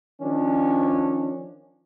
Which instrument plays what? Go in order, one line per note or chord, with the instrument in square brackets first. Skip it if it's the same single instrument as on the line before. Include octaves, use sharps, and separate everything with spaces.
[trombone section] D#3 F3 C#4 D4